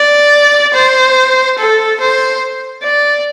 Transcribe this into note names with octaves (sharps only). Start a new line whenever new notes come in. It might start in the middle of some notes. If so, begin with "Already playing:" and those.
Already playing: D5
C5
A4
C5
D5